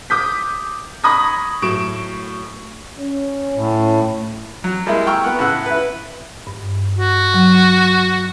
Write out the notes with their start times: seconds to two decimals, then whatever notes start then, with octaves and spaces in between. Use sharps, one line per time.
0.10 D6 D#6 G6 B6
1.04 B5 C#6 D#6 G#6 A#6
1.62 A2 F#3 C#6 D7 E7
2.98 C#4
3.55 A2
4.64 F#3
4.86 G3 G#3 A#3 E4
5.07 G5 A#5 C#6 E6 F6
5.24 B3 F#5
5.39 A2 C#3 F#5 E6 F#6
5.66 E4 B4
6.47 G2
6.99 F#4
7.34 F#3